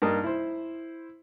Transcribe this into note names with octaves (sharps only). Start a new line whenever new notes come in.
G2 A#3 D#4 A#4 A5 D#6
E4 C5